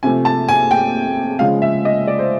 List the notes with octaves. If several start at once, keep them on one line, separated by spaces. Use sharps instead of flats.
C3 F3 A3 G#5
A5
G#5
G5
C#3 F3 G#3 F5
E5
D#5
D5
C5